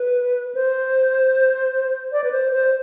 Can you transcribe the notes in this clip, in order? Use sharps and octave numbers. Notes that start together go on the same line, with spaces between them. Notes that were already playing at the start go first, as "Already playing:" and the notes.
Already playing: B4
C5
D5
B4
C5
C5